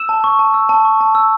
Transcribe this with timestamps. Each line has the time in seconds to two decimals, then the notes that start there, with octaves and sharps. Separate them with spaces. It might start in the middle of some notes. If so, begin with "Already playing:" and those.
Already playing: E6 E7
0.09 A5
0.24 C#6
0.39 A5
0.54 E6
0.69 A5
0.85 C#6
1.01 A5
1.15 E6